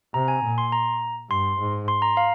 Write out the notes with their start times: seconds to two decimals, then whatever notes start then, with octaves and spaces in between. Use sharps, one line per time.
0.14 C3 A#5
0.28 G#5
0.43 A#2
0.58 C6
0.72 A#5
1.30 G2 C6
1.59 G#2
1.88 C6
2.02 A#5
2.17 F5